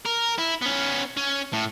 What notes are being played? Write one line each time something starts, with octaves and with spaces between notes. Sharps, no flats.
A#4
E4
B3 C#4
C#4
A2